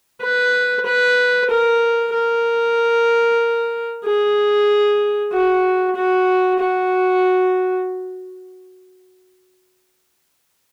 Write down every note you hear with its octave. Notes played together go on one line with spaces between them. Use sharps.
B4
B4
A#4
A#4
G#4
F#4
F#4
F#4